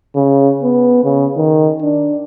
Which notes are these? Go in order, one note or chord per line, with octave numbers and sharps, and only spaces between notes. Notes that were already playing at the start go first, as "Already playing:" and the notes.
C#3
B3
C#3
D#3
D4